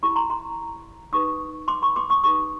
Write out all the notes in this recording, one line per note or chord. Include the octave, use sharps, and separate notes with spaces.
C#4 E4 G4 B5 C#6
A#5 C6
A#5 C6
D#4 G4 B4 C#6 D#6
C6 D6
B5 C#6
C6 D6
C#6 D#6
D#4 G4 B4 C#6 D#6